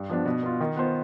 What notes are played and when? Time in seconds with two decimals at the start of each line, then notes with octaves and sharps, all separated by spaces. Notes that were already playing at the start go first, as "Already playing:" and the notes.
Already playing: G2
0.09 F3 B3 D4
0.25 B2
0.43 B3 F4
0.60 D#3
0.76 B3 F4 C5